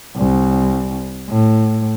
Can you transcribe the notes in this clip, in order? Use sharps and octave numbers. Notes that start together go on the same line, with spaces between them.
C2
A2